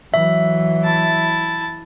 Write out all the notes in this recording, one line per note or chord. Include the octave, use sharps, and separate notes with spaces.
E3 F#3 E5
E4 A5